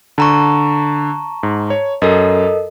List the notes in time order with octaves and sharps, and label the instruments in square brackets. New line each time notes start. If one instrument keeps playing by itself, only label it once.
[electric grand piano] D3 [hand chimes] A5 A#5 C#6
[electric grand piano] G#2
C#5
[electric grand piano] F#2 [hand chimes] A4 A#4 D#5